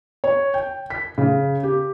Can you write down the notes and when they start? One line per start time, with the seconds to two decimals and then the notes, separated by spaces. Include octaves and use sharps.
0.24 C#5
0.54 G5
0.90 B6
1.18 C#3
1.63 G4